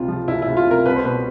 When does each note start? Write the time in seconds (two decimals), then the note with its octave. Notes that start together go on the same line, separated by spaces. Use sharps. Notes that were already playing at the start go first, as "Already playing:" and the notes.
Already playing: C#2 C3 F4
0.08 F3
0.28 C#2 E4
0.42 E4
0.47 C#2
0.57 F4
0.67 C3 A#4
0.86 C2 B4
0.96 C5
1.05 B2 B4